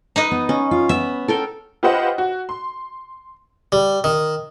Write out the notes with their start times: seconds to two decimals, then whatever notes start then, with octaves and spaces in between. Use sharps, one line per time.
0.16 D#4 B4 D#5
0.31 B3
0.49 C#4
0.71 F4
0.89 B3 E5
1.28 A4 A#4 G5
1.83 F4 G4 B4 C5 D#5 F#5
2.18 F#4
2.49 C6
3.72 G3
4.04 D#3